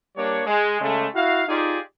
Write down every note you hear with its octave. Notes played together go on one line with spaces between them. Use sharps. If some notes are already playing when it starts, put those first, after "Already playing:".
G3 A#3 D4 C#5
G#3
C#3 G#3 A3
E4 F#4 F5
D#4 F4 G4 G#4 D5